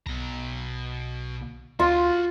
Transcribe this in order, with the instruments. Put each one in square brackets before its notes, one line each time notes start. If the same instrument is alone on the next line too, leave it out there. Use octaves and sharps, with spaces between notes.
[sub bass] B1 [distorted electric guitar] B2 A#5
[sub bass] D2 [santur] F4 [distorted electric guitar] F#4 C6